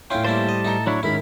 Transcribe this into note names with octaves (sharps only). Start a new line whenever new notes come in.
A2 C#4 E4 F4 G5 C6
A#2 G3 C#4 E4 G4 C5 A5
D#5
A2 D#4 A4 A#5 G7
F#3 D4 E4 C#5
G#2 D#3 G#3 C#4 E4 B5